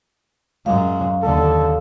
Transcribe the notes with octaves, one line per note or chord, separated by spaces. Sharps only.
F#2 G#3 F5
D#2 D3 A4